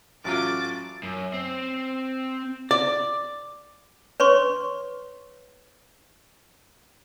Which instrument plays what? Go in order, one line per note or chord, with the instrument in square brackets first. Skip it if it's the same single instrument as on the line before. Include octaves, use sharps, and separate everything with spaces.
[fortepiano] A1 F#3 F4 [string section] D6 [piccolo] A6
[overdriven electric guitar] F#2
C4
[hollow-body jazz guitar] D5
[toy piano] B4 C#5 C6 C#6